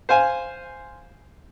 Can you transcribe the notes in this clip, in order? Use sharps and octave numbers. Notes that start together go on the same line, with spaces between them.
C5 F5 G#5